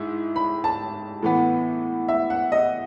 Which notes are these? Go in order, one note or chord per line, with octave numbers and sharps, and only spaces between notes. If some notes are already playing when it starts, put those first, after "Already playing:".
Already playing: G#2 E4
B5
A5
A2 E3 B3
E5
F#5
D#5